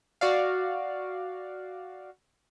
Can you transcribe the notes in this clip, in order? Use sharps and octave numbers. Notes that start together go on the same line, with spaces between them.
F#4 D5 F5